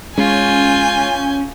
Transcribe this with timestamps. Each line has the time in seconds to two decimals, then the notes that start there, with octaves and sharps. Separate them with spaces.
0.18 G#3 C#4 F4 G#5 G6